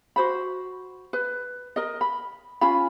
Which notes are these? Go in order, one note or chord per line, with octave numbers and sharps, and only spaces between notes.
F#4 C5 B5
B4
A#4 D#5
B5
C#4 F4 G#5 B5